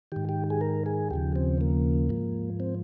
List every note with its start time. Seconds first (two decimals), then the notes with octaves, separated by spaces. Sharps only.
0.12 G#2 D#3 G4
0.29 G4
0.50 G#4
0.61 A#4
0.86 G#4
1.11 D#2 C#3 F3 G4
1.36 C4
1.61 A#3
2.09 G#2 F3
2.60 C4